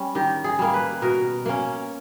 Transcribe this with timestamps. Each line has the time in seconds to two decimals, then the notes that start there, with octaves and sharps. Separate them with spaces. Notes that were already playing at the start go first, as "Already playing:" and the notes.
Already playing: G3 C#4
0.15 D#3 G4
0.44 G#4
0.59 G3 A#3
0.74 B4
1.02 B2 A#4
1.46 A#3 C#4